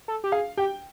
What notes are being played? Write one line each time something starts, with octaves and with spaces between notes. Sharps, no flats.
A4
G4
G#4 F5
G4 G5